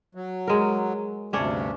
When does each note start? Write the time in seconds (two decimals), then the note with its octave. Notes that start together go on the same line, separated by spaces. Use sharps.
0.15 F#3
0.47 G#3 A#4
1.33 D2 G2 C3 C#4 D4 C#5